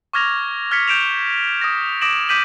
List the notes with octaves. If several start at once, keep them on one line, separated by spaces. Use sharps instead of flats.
C#6 D6 F6 G#6 A#6 F7
F6 G#6 B6 C#7
G6 D7 E7 F7
D#6 A#6
D6 D#6 A#6 D7 E7 F#7
D6 G6 B6 D#7 F#7